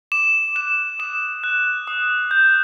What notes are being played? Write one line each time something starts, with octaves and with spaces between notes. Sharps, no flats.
D6 E7
F#6 E7
D#6 E7
F#6
D#6
G6